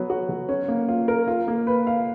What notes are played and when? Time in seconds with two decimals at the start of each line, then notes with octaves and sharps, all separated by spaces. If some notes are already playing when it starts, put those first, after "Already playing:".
Already playing: F#3 B3
0.10 F#4
0.29 F#3
0.49 C#4
0.68 A#3
0.88 F4
1.08 A#4
1.28 F4
1.48 A#3
1.67 B4
1.87 F5